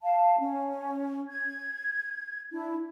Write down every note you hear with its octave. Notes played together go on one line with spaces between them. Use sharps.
F5 A5
C#4
G#6
D4 E4